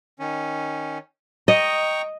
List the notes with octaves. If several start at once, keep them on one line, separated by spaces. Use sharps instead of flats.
D#3 C#4
D#5 G5 A#5 C#6